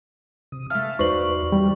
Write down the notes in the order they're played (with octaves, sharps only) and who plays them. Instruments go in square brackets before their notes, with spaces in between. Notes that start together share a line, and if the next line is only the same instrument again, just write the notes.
[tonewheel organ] C3 D#6
[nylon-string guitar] E3 A3 [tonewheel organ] E5 F5 A5 [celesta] F6
[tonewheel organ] E2 F#4 D5 [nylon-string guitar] D#4 B4 C5 [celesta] C#6 F#7
[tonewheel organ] E3 [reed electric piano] G3